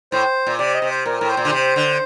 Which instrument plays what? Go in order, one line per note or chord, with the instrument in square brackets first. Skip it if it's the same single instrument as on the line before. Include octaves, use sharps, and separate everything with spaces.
[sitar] A2 [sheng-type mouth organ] C5
[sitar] A#2
[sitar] C3 [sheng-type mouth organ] D5
[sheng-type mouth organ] D#5
[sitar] C3
[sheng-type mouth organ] C5
[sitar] A#2 [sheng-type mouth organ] A#4
[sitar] A2 [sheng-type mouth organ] A#4
[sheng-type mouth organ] C5
[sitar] A#2
D3
C3
D3